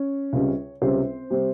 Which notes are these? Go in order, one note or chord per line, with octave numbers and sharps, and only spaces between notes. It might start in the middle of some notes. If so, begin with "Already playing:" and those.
Already playing: C#4 C#5
C#2 C3 G3 C#4
C#2 C3 G3 C4 C#4 C5
C3 G3 C4